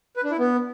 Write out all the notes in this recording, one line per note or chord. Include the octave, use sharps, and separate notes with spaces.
B4
D4
E4
B3